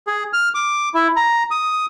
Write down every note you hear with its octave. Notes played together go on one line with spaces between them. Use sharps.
G#4
F6
D6
E4
A#5
D#6